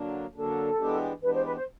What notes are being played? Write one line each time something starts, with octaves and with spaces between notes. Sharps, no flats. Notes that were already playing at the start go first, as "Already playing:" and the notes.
Already playing: D3 F#3 A#3 D4
D3 F#3 A#3 D4 A4
E3 G#3 B3 D4 G4
E3 G#3 B3 D4 G4 B4
C5
B4
C5